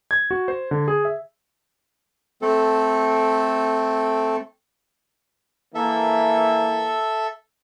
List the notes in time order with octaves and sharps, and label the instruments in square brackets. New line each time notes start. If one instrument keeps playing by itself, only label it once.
[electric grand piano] G#6
F#4
C5
D3
G#4
E5
[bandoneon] A3 C4 A4
[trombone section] E3 A#3 [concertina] A4 E5